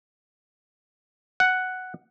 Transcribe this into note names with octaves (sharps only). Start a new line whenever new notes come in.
F#5